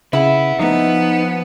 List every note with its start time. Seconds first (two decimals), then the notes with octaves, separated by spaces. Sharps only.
0.13 C#3 E4 B4 F#5
0.59 F3 B3 D#4